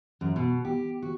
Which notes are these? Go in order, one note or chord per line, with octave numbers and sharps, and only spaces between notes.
F#2
B2
G4
F#4